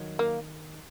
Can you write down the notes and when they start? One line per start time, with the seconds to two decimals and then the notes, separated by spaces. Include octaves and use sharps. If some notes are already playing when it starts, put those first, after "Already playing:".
Already playing: D#3 F#3
0.19 A#3